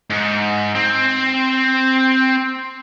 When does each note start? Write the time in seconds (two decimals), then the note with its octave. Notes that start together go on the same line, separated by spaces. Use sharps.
0.10 G#2
0.75 C4